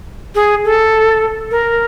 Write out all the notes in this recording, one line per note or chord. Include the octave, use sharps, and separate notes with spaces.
G#4
A4
A#4